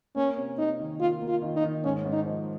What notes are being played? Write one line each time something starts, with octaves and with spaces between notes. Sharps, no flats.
A#3 C#4
C3
C3 D#4
D#3
A#3 F4
A#3
F4
D#3
D#4
D#3
G#2 C#4
G#2
D#4
F3